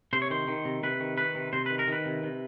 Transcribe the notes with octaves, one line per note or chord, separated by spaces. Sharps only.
C3 C5
C#5
D#3 C5
D#3
C3
C3 B4
D#3
D#3 B4
C3
C3 C5
D#3 B4
A#4
D#3 B4
C3
C3